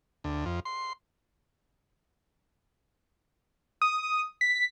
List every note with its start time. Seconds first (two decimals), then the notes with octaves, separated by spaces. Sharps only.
0.24 D2
0.45 F2
0.65 C6
3.82 D#6
4.41 B6